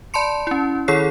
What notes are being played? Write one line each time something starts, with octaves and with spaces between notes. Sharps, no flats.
D5 A5 B5 C6 C#7
C#4 E4
D#3 E4 G#4 A4 C#5 C7